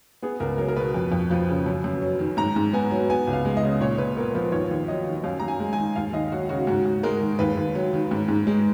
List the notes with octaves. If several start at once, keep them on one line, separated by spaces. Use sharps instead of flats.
B3 G#4
C#2 A#4
F#3 A#4
A#4
B2 B4
F2
F2
F3
C#3
F#2
F#2
F#3
D#3
G#2 A#5
G#2
B3 G#5
F#3
B3 G#5
C#2
F5
G#3
D#5
C#3
A#2 C#5
A#2 B4
B3 A#4
F3 B4
D#2 C#5
D#2
F#3 D#5
D#3
F#2 F5
F#2 A#5
G#5
G#3
G#5
D#3
D#2 F5
D#2 D#5
F#3 F#4
C#3 F#4
G#2 F#4
G#2
G#3 A#4
D#3
D#2 B4
D#2
F#3
D#3
G#2
G#2
G#3